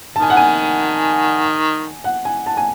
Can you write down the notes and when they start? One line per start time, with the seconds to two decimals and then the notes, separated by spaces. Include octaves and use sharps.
0.16 D#3 A5
0.22 G#5
0.30 F#5
0.37 G#5
2.04 F#5
2.25 G#5
2.46 A5
2.57 G#5